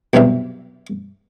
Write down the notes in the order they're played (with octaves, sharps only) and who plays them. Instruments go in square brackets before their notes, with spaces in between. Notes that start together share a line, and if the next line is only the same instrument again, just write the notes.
[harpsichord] B1 E2 G2 C3 E5